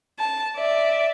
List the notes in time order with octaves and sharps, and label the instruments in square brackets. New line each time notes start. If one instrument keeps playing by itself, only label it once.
[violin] A5
D5 E5